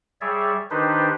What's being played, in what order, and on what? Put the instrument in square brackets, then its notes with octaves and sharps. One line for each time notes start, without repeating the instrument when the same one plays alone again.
[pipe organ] G3 G#4 C#5 D5 E5
D#3 D4 D#4 G4 B4 C5